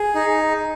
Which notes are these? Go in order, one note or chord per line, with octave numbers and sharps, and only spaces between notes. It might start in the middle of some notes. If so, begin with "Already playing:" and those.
Already playing: G#4
D#4